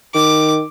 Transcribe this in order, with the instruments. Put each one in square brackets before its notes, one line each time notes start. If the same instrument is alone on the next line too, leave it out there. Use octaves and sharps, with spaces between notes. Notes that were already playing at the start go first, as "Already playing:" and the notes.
[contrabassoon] D#3 [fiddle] D6